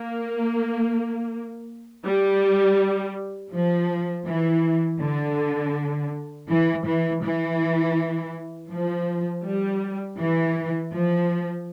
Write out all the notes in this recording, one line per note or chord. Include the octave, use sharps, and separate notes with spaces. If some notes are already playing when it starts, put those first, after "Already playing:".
Already playing: A#3
G3
F3
E3
D3
E3
E3
E3
F3
G3
E3
F3